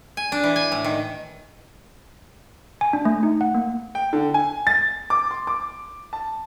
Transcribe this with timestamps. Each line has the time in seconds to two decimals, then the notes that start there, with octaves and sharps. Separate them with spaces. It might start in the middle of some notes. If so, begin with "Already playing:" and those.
0.17 G#5
0.32 D4
0.44 E3
0.56 G#5
0.72 A2
0.84 D#3
2.81 G#5
2.93 D4
3.05 A3
3.23 D#4
3.41 F#5
3.55 A#3
3.95 G5
4.13 D3
4.34 G#5
4.67 A6
5.10 D6
5.31 C6
5.47 D6
6.13 A5